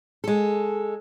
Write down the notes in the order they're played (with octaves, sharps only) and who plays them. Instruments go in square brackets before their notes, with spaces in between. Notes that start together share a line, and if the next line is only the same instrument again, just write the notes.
[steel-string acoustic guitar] G#3 A4